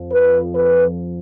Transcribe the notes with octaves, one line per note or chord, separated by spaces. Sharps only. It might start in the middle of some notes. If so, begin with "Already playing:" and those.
Already playing: F2 F3
B4
B4